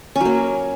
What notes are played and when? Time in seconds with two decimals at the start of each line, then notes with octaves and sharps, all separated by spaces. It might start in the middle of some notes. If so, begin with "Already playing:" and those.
0.16 C#4
0.20 F#3
0.25 A#3